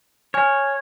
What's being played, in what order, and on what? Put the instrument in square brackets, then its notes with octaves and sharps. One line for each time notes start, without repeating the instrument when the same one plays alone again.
[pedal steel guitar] C#5 [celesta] G#5 F6